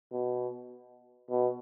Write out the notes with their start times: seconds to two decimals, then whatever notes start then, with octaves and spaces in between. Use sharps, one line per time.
0.12 B2
1.30 B2